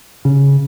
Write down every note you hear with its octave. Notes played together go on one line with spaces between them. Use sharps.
C#3